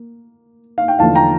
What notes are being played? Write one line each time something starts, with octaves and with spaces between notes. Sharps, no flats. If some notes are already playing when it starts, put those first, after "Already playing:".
Already playing: A#3
F5
G5
E2 D3 F3 A3 D4 F5 A5
G5 A#5